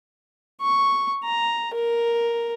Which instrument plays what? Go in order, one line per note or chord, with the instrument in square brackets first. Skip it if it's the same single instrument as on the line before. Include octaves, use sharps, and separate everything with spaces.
[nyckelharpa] C#6
A#5
A#4